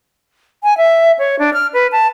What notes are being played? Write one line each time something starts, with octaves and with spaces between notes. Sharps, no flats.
G#5
E5
C#5
D4
F6
B4
A5